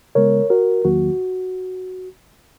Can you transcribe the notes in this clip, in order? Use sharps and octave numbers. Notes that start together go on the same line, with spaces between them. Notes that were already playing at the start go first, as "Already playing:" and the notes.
C#3 G#3 B3 A#4 C#5
F#4 A#4
E2 D#3 F#3 A#3 F#4